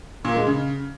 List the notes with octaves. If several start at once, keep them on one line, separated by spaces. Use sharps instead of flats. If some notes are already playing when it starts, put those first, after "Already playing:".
A#2
G#3
C#3